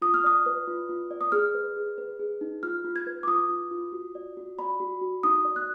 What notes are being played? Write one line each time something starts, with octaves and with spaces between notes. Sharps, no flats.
F4 D#6
F6
D5 D#6
B4
F4
F4
D5
D#6
G#4 F6
B4
G#4
B4
G#4
D#4
F4 F6
F4
G#6
B4
D6
F4 D#6
F4
F4
F#4
D5
F#4
D5 B5
F#4
F#4
D#4 D#6
D5
F#6